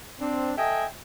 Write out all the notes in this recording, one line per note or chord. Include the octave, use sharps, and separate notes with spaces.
C4 D4
A4 D#5 E5 G5 G#5